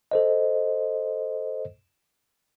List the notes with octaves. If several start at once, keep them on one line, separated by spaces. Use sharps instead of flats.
A4 C5 D#5